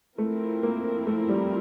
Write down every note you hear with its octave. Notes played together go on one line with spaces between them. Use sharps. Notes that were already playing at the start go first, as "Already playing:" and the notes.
F3 A3 C4 E4 A#4
A#3
A3
G3